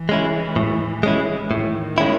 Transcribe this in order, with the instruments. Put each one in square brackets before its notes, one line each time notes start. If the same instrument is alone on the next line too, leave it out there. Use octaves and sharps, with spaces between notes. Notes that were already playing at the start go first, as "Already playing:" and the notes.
Already playing: [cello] E3
[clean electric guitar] G#3 C#4 E4
A2
G#3 C#4 E4
[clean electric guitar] A2 [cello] D#3
[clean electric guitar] G#3 C#4 E4